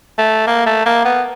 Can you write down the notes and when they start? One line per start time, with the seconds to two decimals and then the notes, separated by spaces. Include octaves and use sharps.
0.18 A3
0.47 A#3
0.66 A3
0.86 A#3
1.05 B3